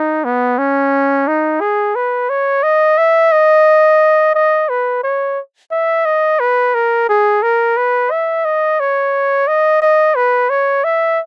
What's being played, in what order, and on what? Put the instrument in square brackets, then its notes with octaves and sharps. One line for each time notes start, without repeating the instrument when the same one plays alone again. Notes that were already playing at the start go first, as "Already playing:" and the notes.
Already playing: [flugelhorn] D#4
B3
C#4
D#4
G#4
B4
C#5
D#5
E5
D#5
D#5
B4
C#5
E5
D#5
B4
A#4
G#4
A#4
B4
E5
D#5
C#5
D#5
D#5
B4
C#5
E5